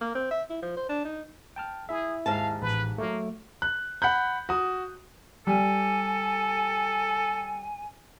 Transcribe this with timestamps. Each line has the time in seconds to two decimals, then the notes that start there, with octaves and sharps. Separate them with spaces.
0.01 A#3
0.15 C4
0.31 E5
0.50 E4
0.62 F3
0.77 C5
0.89 D4
1.05 D#4
1.56 G5 A5 F6
1.89 E4 G#4 E5
2.26 D#2 G#2 F5 A5
2.62 A1 B4
2.98 F#3 A3 A#3
3.62 F#6
4.02 F#5 B5 F#6 G6
4.49 F#4 D#6
5.47 G3 A4 G#5